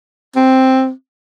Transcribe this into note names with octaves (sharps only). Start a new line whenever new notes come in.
C4